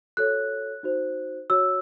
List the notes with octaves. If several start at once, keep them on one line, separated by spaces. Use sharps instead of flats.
F#4 A4 C#5 F#6
D#4 F#4 C5
F#4 C#5 E6